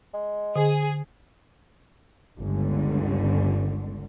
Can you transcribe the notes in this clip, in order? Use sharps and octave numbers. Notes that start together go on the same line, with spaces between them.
G#3
D3 G#4
G1 C#2 D3